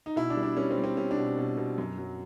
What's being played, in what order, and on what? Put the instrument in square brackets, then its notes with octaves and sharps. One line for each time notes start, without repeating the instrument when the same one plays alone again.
[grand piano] D#4
B2 E4
D4
G3
D4
G3 C#4
C4
G3
C4
G3 C#4
D4
B2
B2
B2
F#2
F#3